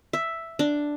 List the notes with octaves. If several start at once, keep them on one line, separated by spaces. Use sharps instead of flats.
E5
D4